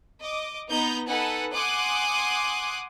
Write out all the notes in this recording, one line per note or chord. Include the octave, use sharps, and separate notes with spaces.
D#5 D6
B3 D#4 A#5 G6
D#4 A4 B4 F#5 G#5
F#5 G#5 C6 D6 D#6 F#6